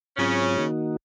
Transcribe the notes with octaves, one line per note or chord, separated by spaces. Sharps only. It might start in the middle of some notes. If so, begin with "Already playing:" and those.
G#2 C#3 F#3 C4 C#4 F4
D#3 A#3 D#4 F#4